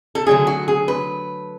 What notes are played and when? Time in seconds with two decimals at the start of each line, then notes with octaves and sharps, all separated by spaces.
0.15 A4
0.26 D3 F#3 A3 G#4
0.47 F#4
0.68 G#4
0.88 B4